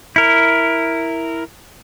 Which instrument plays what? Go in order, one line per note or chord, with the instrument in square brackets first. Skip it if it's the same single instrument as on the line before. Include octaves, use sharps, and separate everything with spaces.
[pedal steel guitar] E4 A#4